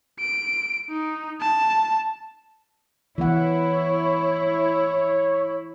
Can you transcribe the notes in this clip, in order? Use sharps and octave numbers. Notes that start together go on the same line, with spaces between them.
D7
D#4
A5
E3 B3 E4 C#5 F#5